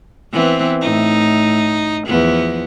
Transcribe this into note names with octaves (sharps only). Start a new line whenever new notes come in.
E3 B3 C4
A2 D#4
E2 F3 B3